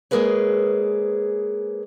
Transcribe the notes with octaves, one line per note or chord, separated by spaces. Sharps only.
G#3 A#3 G#4 B4 C#5